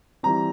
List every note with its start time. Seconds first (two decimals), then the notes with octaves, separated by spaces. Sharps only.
0.23 E3 G3 C4 A#5